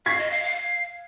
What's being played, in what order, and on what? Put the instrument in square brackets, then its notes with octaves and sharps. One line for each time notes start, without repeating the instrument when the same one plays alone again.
[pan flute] F5 [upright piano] G#6 B6
[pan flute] D#5
F5
F5